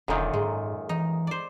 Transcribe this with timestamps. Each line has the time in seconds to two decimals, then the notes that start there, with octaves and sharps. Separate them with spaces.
0.08 E1 F#2 A#2 D3 D#3 D#4
0.34 G#2 G#3
0.89 E3 D#4
1.27 C5 D5